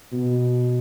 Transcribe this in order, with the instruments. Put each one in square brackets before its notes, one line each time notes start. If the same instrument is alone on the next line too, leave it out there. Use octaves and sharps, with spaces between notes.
[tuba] B2